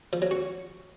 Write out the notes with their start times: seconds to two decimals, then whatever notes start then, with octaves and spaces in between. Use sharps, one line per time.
0.13 F3
0.22 F#3
0.31 F#4